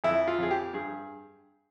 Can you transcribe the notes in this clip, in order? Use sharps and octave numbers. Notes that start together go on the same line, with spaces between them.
F2 E4
F4
F2 G#4
G4
G2 G#4